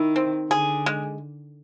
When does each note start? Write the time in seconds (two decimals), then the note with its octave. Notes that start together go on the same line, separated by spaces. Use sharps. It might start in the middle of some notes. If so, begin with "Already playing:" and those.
Already playing: D#3 E4
0.16 C4
0.50 D3 G#4
0.86 G#3